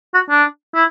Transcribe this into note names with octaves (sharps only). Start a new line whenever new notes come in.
F#4
D4
E4